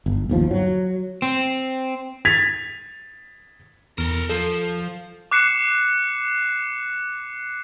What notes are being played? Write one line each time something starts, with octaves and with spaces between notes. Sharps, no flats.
G1
G1 D#2 F3
F#3
C4
G#6 A6 B6 F7
E2 A4 A#4
F3 A4
D6 F#6 C7 C#7 E7